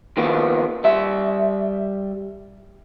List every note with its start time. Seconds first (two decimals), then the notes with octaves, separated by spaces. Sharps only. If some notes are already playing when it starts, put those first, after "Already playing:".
0.17 D#3 F3 A#3 B3
0.84 G3 E5